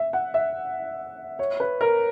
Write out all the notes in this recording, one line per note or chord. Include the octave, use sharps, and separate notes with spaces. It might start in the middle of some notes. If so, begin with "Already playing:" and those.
Already playing: E5
F#5
E5
C#5
B4
A#4